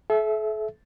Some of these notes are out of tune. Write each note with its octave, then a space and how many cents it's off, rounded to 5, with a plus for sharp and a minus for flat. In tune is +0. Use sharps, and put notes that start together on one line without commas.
A4 -40 E5 +0